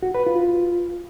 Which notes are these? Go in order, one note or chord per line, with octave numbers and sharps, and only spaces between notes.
F#4
B4
F4